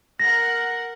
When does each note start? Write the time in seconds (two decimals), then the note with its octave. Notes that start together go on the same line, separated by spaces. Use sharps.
0.20 A#4 F#5 A#6